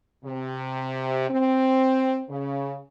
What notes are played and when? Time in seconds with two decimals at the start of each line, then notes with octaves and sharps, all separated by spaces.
0.25 C3
1.30 C4
2.30 C#3